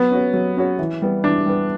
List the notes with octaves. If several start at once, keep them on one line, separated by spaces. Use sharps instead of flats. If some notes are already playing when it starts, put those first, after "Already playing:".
Already playing: F#3 B3
C#4 F#4 C#5
F#3
C#4 F#4 C#5
E3
G3 B3
E3 D4
G3 B3